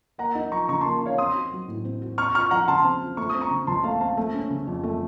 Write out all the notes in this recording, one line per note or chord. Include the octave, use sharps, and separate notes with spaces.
A#3 F#5 A#5
D#4
F3 A#5 C#6
C#3 A#5 C#6
A5 C6
A#3
D#4 C#5 F5
C4 C6 D#6
F#4
F#3
A2
C4
F#4
C4 C#6 F6
F4 C#6 F6
F3 F#5 A#5
C#3 A5 C6
C4
F4
A3 C#6
D#6
C4
A#5 C#6
C#3
C#2 A5 C6
A3 F5 A5
C4 F5 A5
A3
C#4
C#3
F2
A3